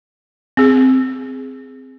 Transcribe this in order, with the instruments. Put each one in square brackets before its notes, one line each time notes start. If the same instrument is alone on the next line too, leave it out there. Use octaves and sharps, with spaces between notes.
[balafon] C4 G#4